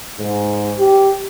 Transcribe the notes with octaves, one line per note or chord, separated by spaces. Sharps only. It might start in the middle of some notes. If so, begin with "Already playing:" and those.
G#2
G4